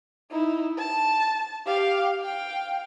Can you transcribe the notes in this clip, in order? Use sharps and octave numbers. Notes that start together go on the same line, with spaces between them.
D#4 E4
A5
G4 F5
F5 G5